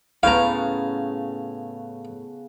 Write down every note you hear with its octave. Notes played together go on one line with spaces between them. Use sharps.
A2 C#3 B3 F5 A#5